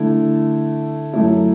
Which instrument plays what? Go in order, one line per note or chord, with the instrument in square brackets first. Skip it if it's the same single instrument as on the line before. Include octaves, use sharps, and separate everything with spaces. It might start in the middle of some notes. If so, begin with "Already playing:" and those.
Already playing: [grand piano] D3 A3 E4
F#2 F#3 A3 E4